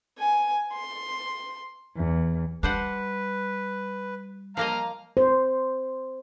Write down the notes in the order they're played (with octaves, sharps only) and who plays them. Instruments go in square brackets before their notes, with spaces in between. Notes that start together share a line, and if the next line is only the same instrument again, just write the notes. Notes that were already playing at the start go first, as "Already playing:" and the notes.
[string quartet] G#5
C6
E2
[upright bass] G3 [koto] D4 C5 F#5 [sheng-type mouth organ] B4
[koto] F3 A#3 D#5 [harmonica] F5 A#5
[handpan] C5